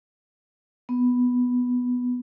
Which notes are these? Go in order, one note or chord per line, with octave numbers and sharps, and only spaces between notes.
B3